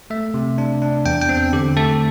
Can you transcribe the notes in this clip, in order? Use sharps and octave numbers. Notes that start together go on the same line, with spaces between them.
A3 E5
C3
D4
D4
E2 G5
G5
C4
D3 G4
A3 A4